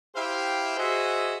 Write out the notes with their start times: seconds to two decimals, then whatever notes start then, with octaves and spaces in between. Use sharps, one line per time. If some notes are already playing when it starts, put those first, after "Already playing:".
0.15 E4 G4 C5 E5 F5 G5
0.77 F#4 G#4 C5 D#5 E5